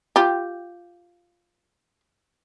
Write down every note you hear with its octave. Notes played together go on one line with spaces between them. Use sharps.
F4 G4